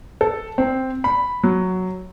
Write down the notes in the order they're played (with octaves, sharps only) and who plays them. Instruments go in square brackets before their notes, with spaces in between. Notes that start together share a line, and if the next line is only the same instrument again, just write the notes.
[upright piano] A4
C4
B5
F#3